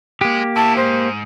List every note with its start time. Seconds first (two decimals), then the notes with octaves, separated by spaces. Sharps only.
0.21 G#3 A#3 G4
0.56 B2 E4 A5
0.76 G#2 C5